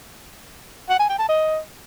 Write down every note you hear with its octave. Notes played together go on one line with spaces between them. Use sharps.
F#5
G#5
G5
A5
D#5